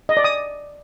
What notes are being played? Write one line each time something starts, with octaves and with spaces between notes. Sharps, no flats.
D#5
D5
D#6